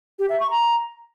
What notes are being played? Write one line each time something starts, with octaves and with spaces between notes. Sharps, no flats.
G4
E5
C#6
A#5